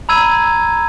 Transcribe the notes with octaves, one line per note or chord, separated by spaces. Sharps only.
A#5 B5 E6 G#6 D#7